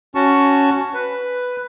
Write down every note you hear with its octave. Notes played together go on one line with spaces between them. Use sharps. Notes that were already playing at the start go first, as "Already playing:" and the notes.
C#4 F#4 A5 C#6
B4